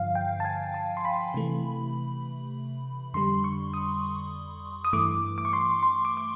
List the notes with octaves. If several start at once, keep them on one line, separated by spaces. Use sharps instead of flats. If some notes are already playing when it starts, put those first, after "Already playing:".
Already playing: G2 D3 F3 F5
G5
A5
G#5
A5
C6
B5
C3 E3 A3
F2 D3 G3 C6
C#6
D#6
D#6
G2 E3 A3 D6
D6
C#6
C6
C6
D6
D6